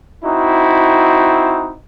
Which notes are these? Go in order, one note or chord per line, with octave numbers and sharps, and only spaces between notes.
C4 D#4 E4 F#4